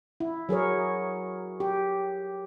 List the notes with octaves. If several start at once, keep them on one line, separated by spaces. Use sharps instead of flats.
E4
F#3 G#4 A#4 C#5
G4